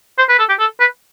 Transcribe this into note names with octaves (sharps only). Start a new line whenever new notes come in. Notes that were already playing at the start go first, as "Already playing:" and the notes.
C5
B4
A4
G4
A4
B4